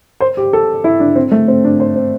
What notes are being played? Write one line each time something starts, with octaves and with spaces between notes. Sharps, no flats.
C5
G4
A4
E4
D4
C4
A3
C4
D4
C5
C4